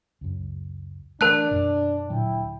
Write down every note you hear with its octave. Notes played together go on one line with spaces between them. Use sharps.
C#2 F#2
E3 A3 D4 A#4 A5 F#6
F#2 B2
D2 A#2 F#3 E4 G5